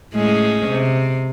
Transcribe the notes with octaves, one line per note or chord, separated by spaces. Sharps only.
A2 G#3 C#4
C3